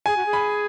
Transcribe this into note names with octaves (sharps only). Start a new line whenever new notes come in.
G#4 G#5
F#4
G#4
B5